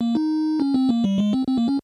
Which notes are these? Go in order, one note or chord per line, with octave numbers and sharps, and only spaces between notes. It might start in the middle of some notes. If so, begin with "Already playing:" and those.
A#3
D#4
C#4
C4
A#3
G3
G#3
C4
C4
A#3
C#4